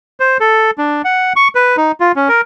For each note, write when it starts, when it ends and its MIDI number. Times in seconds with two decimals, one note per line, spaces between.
0.20 0.37 72
0.40 0.71 69
0.78 1.02 62
1.05 1.33 78
1.36 1.48 85
1.55 1.76 71
1.77 1.92 63
2.00 2.12 65
2.16 2.29 61
2.29 2.41 70